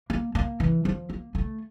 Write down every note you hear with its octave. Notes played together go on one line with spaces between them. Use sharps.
A#3
A#3
E3
F3
A#3
A3